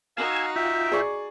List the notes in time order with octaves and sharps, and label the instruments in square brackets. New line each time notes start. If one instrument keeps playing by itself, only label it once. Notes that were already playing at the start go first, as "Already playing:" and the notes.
[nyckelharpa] D#4 F#4 [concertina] F5 [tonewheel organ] G#5 E6 G#6
[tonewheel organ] F4 G5 [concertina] E5
[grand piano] G#4 D5 C#6